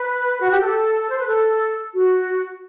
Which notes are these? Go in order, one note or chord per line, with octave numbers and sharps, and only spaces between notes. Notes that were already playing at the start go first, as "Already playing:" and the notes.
Already playing: B4
F#4
G4
A4
C5
B4
A4
F#4